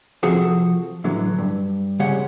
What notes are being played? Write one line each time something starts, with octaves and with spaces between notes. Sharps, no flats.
C3 F3 C4 F#4 G#4 A4
A2 D3 E3 F#3
G2
C2 C#3 G#3 G4 C#5 F#5